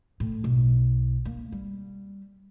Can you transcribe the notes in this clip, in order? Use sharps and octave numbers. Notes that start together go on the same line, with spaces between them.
A2
B1
A#3
G3